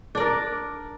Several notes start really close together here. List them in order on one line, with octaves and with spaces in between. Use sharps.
D4 D5 A#4